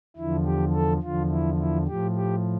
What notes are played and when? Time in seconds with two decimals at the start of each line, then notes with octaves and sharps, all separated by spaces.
0.16 E2 D3 F3 E4
0.45 G4
0.73 A4
1.02 E2 D3 F3 F4
1.30 E4
1.58 E4
1.87 A2 F3 G4
2.16 G4